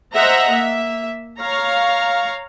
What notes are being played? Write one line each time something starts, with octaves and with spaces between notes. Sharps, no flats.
C5 D#5 E5 F#5 A#5
A#3 E5
C#5 F5 A#5